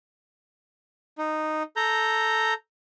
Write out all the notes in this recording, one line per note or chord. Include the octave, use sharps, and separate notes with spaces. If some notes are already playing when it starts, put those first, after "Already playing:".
D#4
A4 A#5 G6